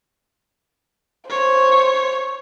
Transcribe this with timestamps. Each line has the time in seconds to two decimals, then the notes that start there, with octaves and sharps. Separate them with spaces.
1.30 C5 C#5